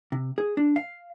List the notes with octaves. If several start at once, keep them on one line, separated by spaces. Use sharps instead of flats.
C3
G#4
D4
F5